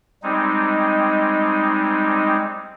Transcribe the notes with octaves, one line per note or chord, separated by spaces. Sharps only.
G3 G#3 C4 D#4